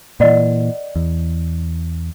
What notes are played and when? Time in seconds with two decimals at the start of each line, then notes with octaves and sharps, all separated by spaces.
0.20 A#2 E3 D5 D#5 F#5
0.96 E2